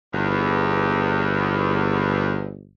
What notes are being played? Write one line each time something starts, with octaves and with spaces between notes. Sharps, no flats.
G1 E2